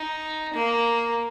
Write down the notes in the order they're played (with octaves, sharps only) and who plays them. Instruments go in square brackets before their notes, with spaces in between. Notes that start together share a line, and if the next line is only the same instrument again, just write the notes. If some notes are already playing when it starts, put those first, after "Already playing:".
Already playing: [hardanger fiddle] D#4
A#3